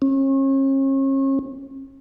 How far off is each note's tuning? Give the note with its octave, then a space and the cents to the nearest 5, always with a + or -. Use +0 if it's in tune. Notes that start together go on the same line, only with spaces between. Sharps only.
C#4 -40